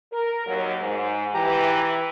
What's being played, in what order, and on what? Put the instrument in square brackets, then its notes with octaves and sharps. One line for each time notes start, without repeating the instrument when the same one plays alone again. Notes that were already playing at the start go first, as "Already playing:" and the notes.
[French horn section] A#4
D#2 F#3
G#2
[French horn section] E3 [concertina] G4 A#5